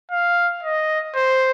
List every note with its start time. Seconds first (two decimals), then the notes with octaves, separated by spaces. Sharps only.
0.11 F5
0.63 D#5
1.16 C5